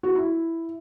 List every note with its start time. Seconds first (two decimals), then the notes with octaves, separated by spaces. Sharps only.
0.03 F#4
0.15 E4